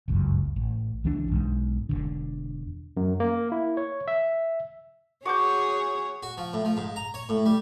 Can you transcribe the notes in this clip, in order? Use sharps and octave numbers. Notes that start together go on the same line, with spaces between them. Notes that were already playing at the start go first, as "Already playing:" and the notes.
G1 C#2 F#2
A1
C#2 E3 F3 D4
B1 G#2
E1 A#1 D3
F#2
A#3
E4
C#5
E5
F#4 G#4 C#5 D6 G6
F#4
F3
A2
F3
G#2
A#5
C#5
A2
G3